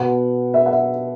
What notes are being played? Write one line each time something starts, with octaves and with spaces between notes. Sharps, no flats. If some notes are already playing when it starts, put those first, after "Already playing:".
Already playing: B2 B3 F#5
E5
F#5
E5